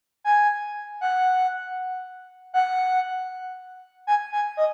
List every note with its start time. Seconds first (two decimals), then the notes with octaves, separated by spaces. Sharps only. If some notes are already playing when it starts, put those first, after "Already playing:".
0.24 G#5
1.01 F#5
2.54 F#5
4.07 G#5
4.33 G#5
4.57 D#5